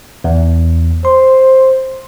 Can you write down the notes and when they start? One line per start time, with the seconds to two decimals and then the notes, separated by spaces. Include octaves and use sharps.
0.24 E2
1.05 C5 C6